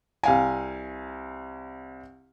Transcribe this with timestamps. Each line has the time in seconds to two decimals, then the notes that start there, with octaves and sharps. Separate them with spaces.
0.23 C2 F5 G#5